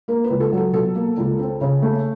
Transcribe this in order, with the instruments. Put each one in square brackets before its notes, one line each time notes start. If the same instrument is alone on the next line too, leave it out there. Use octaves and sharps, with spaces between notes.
[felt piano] A#3 A#4
B4
C#2
A4
F#3
A4
B2 A4
A#3
C#2
C4
C#3
A3